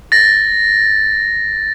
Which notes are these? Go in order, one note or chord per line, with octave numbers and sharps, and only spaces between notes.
A6 A#6